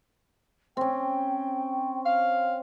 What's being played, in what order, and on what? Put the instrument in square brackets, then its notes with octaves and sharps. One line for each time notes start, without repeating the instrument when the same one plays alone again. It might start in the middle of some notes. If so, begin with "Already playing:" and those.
[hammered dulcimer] C4 C#4 [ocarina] G5
[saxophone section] F5